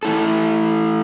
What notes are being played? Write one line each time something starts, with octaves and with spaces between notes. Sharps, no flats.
E3 A3 E4 A4